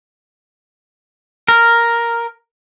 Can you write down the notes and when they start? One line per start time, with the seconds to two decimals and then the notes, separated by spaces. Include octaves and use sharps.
1.48 A#4